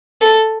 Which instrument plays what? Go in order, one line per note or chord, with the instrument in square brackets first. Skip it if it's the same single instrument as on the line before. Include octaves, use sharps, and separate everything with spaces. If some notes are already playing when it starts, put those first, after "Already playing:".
[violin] A4